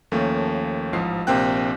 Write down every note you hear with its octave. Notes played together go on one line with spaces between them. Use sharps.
D#2 F3 A3 A#3 C#4
A1 G#2 F3 C7
A#1 C3 A#3 C4 G5 F#6